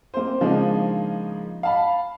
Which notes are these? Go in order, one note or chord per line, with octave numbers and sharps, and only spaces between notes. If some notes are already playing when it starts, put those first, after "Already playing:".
A#3 C4 C5
C#3 F3 G#3 A#3 D4 D#4
F5 A5 B5